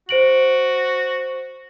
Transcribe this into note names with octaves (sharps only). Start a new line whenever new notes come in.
F#4 C5 D7 F#7